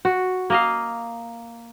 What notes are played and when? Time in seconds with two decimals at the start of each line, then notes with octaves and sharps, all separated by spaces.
0.05 F#4
0.50 A#3 D#5 F5